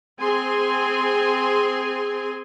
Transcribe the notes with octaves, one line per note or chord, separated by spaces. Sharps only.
C4 G#4 G#5 C6